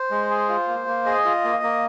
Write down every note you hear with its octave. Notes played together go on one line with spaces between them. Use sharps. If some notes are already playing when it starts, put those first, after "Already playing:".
Already playing: C5
G#3
G#4
F4
A#3
A#3
G#4 D#5
F4
A#3
A#3